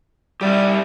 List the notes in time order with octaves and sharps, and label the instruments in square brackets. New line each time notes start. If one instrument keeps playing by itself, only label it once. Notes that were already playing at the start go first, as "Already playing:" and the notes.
[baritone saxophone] G3 [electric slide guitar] G4 D5 E5